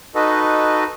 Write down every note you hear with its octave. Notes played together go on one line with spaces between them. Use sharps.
D#4 F#4 A4 B4 D#5